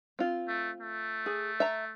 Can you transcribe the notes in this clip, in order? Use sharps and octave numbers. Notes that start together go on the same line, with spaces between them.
C4 F4
A3
A3
G#4
E5 A#5